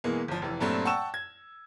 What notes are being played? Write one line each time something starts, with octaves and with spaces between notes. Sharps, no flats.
B2 E3 G#3 A#3
G1 F3
F1 E3
G2 A#2 F#3 A3 C4
F#5 G5 A5 C#6 E6 E7
G#6